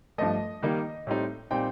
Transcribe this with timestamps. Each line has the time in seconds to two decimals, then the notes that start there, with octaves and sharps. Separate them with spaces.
0.18 G2 F3 A3 D#5
0.62 D#3 G3 A#3 D#4
1.07 A2 G3 C4 D#4
1.51 A#2 G3 C4 D#4 G5